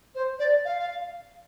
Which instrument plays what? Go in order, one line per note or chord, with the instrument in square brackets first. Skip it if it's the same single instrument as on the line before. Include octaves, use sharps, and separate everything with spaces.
[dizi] C5
D5
F5